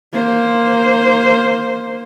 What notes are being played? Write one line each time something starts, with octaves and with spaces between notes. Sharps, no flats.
A#3 C5